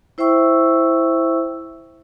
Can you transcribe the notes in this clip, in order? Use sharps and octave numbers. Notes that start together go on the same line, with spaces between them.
E4 C5 E5 G5 C#6 E6